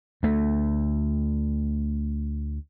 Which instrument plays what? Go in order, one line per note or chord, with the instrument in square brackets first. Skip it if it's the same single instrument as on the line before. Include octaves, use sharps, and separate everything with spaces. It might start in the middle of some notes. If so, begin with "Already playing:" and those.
[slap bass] D2 A3